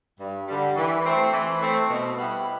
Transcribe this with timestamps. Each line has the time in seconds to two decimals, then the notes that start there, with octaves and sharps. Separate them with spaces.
0.19 G2
0.48 D3 G3
0.76 E3
1.04 A3 C4
1.32 E3
1.61 A3 C4
1.90 B2
2.18 G3 B3 E4 G4